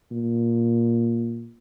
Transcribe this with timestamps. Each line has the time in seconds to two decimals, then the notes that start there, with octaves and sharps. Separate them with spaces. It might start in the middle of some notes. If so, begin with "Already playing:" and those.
0.11 A#2